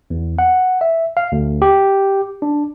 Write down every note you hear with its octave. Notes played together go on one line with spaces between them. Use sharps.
E2
F#5
E5
F5
D2
G4
D4